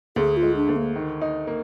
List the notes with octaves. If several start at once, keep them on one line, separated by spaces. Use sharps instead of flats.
D2 G#4
F4
G#3
D4
D2
A#3
D#3
D#4
A#3